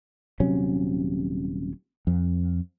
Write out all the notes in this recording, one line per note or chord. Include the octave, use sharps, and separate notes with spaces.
D#1 C3 F#3 C#4
F2